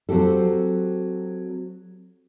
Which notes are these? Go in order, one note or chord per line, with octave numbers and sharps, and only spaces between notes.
F#3 C4 F#4 G4 A4